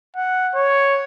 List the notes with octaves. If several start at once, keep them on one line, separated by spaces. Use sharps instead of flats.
F#5
C#5